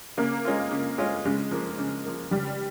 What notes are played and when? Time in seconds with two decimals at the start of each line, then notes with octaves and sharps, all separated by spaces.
0.17 C#3 A#3
0.45 G#3 C#4 F4
0.71 C#3
0.98 G#3 C#4 F4
1.25 C#3 G#3
1.51 F3 A#3
1.78 C#3
2.05 F3 A#3
2.31 C#2 G3